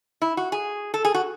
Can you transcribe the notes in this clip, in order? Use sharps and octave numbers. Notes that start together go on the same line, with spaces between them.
E4
F#4
G#4
A4
G#4
F#4